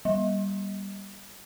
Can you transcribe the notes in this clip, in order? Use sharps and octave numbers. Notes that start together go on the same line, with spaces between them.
G3